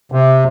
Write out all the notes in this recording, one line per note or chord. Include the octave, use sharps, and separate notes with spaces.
C3